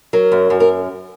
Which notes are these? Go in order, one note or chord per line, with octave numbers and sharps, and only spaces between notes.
F#3 A#4
F#2
F#2
A#4